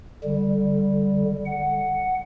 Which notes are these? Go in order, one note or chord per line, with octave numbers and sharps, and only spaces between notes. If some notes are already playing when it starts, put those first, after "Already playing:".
D3 G3
F#5